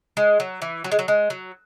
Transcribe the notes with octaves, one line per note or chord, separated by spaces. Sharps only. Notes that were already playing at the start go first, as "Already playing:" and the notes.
G#3
F#3
E3
F#3
G#3
F#3
G#3
F#3